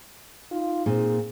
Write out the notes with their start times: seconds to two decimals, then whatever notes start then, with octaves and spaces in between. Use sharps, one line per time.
0.51 D#4 F4
0.86 A#2 C4 G#4